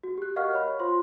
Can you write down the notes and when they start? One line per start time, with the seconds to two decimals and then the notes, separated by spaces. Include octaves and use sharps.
0.03 F#4
0.18 G4 F#6
0.36 A#4 D#5 F5 F#5 C#6 F6
0.53 C#5 B5
0.79 F4 C5 C6